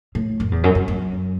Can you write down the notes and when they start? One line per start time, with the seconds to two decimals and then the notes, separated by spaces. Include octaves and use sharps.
0.15 A2
0.40 F#2
0.52 E2
0.64 F#2
0.75 F#2
0.88 F#2